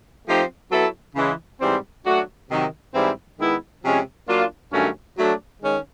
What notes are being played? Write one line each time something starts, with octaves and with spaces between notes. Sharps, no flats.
F3 A3 C4 D#4 G4
F#3 B3 E4 A4
C#3 E3 G#3
G#2 E3 G3 C4
F#3 A3 D4 F#4
C3 D#3 F#3
G#2 E3 G3 C4 E4
D#3 G#3 B3 E4
C3 F3 G#3 C#4
F#3 A#3 D4 F4
G2 D#3 F#3 A3 C#4
F#3 A3 D4
D#3 G#3 C#4